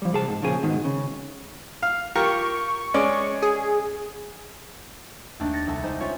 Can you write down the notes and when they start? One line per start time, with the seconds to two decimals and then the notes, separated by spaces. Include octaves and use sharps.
0.02 F3 G3
0.13 C2 G#4 A5
0.28 G#2
0.42 A#2 C#3 F3 G#4
0.63 G#2 B2 D#3
0.85 C#3
1.83 F5
2.15 F4 G4 A#4 C#6
2.94 G#3 C#4 D5
3.42 G#4
5.40 D#2 A3 D4 D#4
5.53 A6 A#6 C#7
5.67 C2 B3 A4 E5 A5
5.84 G#3 D#4 C5 D#5
6.00 C#4 F4 C#5 E5